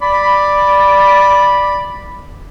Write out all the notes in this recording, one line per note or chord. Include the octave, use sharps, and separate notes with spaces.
D5 B5